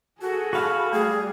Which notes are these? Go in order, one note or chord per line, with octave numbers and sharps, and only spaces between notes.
F#4 G#4 A4
F#4 F5 B5
G3 A3 G#4